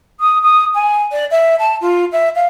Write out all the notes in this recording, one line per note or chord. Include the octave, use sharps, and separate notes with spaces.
D#6
D#6
G#5
D5
E5
A5
F4
E5
F5